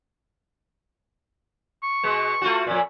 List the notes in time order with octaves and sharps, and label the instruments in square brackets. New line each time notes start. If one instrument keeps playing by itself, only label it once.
[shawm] C#6
[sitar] B2 G#3
A3 F4 F#4
F2 A#2